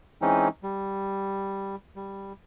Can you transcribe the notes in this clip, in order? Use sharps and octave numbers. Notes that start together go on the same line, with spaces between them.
E3 G#3 C4 C#4 D#4
G3
G3